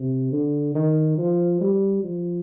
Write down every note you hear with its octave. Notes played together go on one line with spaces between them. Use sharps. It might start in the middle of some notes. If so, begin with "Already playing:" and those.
Already playing: C3
D3
D#3
F3
G3
F3